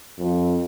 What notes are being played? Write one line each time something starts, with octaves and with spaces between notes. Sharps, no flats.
F2